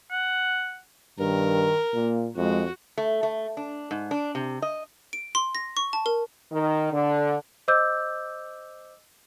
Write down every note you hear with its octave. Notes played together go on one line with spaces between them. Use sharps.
F#5
G2 D#3 A#4
A#2 A#3
F2 G#3 F#4
A3
A3
D4
G#2
D4
C3
D#5
D7
C6
A#6
C#6
A5
A#4
D#3
D3
C5 D#5 D6 E6 G6